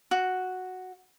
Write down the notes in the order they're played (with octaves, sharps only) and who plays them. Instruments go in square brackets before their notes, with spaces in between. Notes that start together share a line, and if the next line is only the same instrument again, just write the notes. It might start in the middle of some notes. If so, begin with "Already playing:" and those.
[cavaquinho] F#4